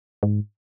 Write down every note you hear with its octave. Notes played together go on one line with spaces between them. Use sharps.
G#2